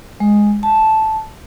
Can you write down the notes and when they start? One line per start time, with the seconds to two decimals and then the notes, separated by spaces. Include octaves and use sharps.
0.20 G#3
0.63 A5